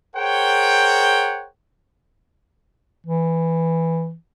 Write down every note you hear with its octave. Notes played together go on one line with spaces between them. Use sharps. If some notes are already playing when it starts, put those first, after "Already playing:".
G#4 A#4 C5 C#5 F#5 G5
E3